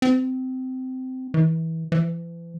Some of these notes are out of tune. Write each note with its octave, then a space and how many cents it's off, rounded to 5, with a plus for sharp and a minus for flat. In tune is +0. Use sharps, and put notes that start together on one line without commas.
C4 -20
E3 -25
E3 +40